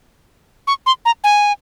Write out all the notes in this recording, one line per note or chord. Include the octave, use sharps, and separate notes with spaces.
C#6
C6
A#5
G#5